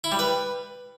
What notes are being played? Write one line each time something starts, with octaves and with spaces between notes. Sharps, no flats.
E4
G3
B4